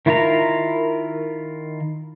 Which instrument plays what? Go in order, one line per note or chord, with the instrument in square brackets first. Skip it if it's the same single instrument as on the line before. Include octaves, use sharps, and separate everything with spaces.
[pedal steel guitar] D#3 E4 F4 A#4 A#5